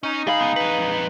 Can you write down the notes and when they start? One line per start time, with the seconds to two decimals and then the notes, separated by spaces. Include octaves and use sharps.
0.03 C#4 D#4
0.27 G3 G#4 F5 B5
0.40 C#2 B3
0.56 F2 B4